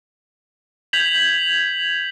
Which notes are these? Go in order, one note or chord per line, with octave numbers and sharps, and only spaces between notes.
G6 G#6 B6 F7 F#7